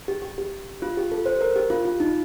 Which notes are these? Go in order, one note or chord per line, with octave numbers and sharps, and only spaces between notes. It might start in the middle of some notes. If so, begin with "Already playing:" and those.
G4
G4
G4
F4
G4
A4
C5
A#4
G4
F4
F4
D#4